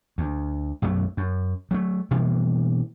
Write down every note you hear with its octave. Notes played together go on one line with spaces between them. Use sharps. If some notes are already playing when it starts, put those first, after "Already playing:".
D2
B1 F#2 F#3 A3
F#2
F#3 G#3 A3
B2 E3 G3 A#3